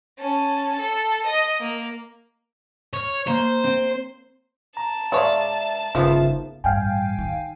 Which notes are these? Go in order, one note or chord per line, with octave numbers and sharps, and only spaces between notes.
C#4 A5
A4
D#5
A#3
C#5 F6
A#3 C5
C4
A5 A#5
G#3 C#5 D5 E5 F5
G1 C#3 F3 B3 D#4 F4 A#4 E5
A1 G2 F5 G5 G#5
D#3